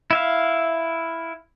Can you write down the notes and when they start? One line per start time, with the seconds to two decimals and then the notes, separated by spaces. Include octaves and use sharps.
0.11 E4 E5 F5